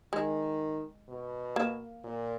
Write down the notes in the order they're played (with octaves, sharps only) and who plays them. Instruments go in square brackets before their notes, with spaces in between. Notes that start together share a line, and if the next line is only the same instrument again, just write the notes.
[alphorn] D#3 [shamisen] G#3
[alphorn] B2
[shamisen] A#3
[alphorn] A#2